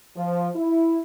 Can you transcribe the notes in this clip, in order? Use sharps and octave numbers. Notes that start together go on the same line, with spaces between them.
F3
E4